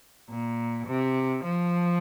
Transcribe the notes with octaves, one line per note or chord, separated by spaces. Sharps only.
A#2
C3
F3